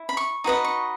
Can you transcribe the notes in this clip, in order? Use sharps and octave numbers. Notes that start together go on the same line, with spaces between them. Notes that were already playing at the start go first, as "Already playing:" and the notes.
Already playing: E4
B5
C#6
D#4 F#4 B4 D#5
C#6